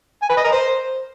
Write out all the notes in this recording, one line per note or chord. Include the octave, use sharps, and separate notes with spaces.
G#5
B4
D#5
A#4
C5